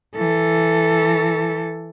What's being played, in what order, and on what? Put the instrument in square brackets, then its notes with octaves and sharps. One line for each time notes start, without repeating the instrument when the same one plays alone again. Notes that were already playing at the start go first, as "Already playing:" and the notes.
[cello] E3 A4